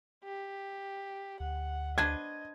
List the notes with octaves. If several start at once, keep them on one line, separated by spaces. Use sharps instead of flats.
G4
D2 F#5
D4 B4 C5 D#5 G#6